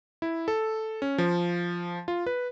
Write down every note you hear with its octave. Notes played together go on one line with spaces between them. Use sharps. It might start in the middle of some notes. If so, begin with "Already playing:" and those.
E4
A4
C#4
F3
F4
B4